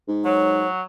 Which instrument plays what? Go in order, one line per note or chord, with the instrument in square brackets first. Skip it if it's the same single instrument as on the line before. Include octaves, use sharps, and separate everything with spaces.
[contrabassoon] G#2
[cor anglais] F#3 [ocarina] C#5